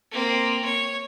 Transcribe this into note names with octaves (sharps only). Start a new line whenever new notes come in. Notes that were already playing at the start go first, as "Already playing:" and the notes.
A#3 C4
C#5